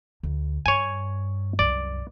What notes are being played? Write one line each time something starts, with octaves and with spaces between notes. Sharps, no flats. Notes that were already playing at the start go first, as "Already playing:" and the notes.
D2
G2 C#5 G#5
C2 F#2 D5